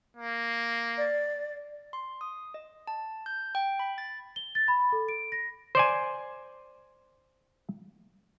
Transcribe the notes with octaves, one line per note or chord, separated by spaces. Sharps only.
A#3
D5
C6
D#6
D#5
A5
G6
G5
B5
A6
G7
A6
B5
A4
D7
A#6
C5 D5 G#5